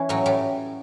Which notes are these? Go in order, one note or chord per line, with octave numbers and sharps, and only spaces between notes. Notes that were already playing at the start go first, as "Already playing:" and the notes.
Already playing: E3 C#4
A2 F#3
A2 G3